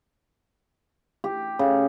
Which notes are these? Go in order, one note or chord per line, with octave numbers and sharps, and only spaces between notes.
G4
C#3